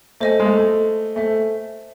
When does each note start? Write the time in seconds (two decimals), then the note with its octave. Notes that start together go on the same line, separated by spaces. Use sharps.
0.20 A3 C5 D#5 G#5
0.40 G#3
0.45 A3
0.57 A3
1.16 A3 C5 E5 G#5